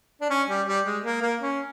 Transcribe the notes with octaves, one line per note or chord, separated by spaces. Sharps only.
D4
C#4
G3
G3
G#3
A#3
A#3
C#4